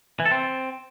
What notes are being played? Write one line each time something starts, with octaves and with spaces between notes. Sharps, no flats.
E3
A4
C4